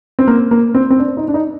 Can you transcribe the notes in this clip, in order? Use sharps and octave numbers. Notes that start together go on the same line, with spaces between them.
C4
A#3
A#3
C4
C4
D4
D#4
D4
D#4